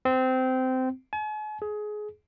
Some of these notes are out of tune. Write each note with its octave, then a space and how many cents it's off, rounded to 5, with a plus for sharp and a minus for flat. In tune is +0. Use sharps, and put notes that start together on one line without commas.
C4 -20
G#5 +45
G#4 +20